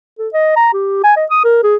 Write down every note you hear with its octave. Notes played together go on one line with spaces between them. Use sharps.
A4
D#5
A#5
G4
G#5
D#5
D#6
A#4
G#4